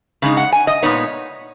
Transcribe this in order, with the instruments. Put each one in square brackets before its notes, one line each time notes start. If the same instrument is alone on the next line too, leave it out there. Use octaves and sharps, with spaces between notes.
[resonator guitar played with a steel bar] C#3 G#3 D#4
F#5
G#5
D#5
A#2 G#3 B3 D#4 C#5